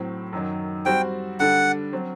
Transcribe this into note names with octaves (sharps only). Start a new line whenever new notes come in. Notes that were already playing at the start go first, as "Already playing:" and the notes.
Already playing: A2 F#3 C4
F#2 D#3 F#3
G3 C4 F#4 C5 G5
D3 G3 D4 F#5
F#3 C4